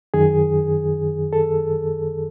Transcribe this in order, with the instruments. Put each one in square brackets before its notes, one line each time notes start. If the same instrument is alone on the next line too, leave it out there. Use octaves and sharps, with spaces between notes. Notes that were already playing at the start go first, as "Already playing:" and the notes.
[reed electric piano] F#2 D#3 G#4
A4